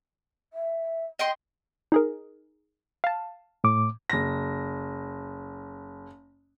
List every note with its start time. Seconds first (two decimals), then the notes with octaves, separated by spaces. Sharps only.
0.53 E5
1.19 D#5 G5 C6
1.92 D#4 G#4 A#4
3.04 F5 A5
3.64 A2 D6
4.10 F#1 A#6